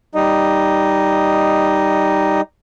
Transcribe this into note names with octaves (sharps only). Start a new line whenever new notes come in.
G3 D#4 D#5